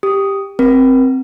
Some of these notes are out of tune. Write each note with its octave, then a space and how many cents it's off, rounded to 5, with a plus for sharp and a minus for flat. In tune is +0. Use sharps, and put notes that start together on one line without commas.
G4 +5 D#6 +0
C4 +0 A#4 +30